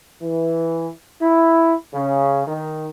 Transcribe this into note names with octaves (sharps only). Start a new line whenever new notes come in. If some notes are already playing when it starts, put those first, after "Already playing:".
E3
E4
C#3
D#3